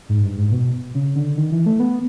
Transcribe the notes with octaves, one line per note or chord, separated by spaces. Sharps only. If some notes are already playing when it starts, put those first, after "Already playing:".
G#2
G2
G#2
B2
C#3
D3
D#3
E3
A3
B3